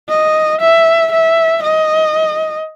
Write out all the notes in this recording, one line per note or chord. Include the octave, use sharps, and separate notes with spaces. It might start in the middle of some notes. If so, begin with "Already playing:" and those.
D#5
E5
E5
D#5